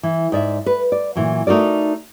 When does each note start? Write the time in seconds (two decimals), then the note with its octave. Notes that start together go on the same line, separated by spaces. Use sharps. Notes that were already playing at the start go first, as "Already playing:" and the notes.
0.03 E3
0.32 G#2 D5 E5
0.66 B4
0.92 D5
1.16 A#2 E3 F#3
1.47 A3 D#4 F#4 A#4 D5